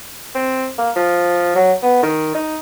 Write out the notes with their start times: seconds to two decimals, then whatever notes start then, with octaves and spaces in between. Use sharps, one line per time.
0.35 C4
0.78 A#3
0.96 F3
1.55 F#3
1.83 B3
2.03 D#3
2.35 D#4